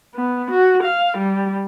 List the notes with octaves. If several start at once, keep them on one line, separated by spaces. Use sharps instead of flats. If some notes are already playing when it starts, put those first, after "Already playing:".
B3
F#4
F5
G3